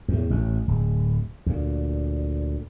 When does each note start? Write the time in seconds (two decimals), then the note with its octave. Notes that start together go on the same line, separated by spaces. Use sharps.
0.08 E2 A2
0.30 A1 A2
0.68 D1
1.46 D2 A#2